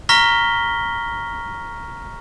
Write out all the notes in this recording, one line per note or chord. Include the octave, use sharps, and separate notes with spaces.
A#5 C#6 F6 A#6 B6 G7